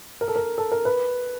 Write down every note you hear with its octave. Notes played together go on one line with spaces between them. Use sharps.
A#4
A4
A#4
A4
A#4
B4